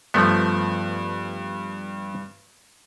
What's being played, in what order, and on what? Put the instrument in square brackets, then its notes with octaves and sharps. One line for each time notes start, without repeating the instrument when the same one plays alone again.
[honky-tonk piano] G2 [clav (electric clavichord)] F3 A3 B3